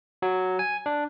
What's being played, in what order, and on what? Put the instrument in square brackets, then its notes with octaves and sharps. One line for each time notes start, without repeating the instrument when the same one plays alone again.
[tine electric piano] F#3
G#5
D4